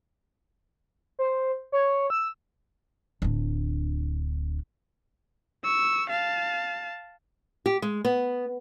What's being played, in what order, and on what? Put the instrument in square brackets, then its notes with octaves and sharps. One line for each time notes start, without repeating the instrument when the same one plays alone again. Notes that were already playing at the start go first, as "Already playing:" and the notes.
[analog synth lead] C5
C#5
E6
[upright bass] D1 D4
[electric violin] C#6 E6
F5 A5
[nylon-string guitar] G4
G#3
B3